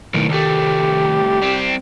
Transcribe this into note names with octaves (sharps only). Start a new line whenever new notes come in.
B1 A2 D#3
C2 A3 G4
G3 C4